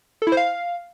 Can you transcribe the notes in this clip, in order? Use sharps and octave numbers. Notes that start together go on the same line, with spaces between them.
A4
E4
C5
F5